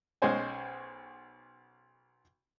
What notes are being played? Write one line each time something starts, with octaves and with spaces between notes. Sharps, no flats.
B1 G#3 C#4 C5 G#5